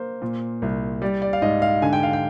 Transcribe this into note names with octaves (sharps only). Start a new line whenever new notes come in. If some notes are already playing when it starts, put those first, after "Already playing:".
Already playing: A#3 C5
A#2
C2
G3 D5
D5
F5
G#2 D#5
F5
D3 G#5
G5
F5
G5